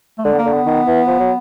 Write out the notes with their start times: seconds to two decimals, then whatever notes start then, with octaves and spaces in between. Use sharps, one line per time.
0.18 A3
0.25 D3 G#3
0.33 B3
0.38 A#3
0.46 D3
0.52 B3
0.66 D#3
0.87 E3
1.07 F3
1.19 F#3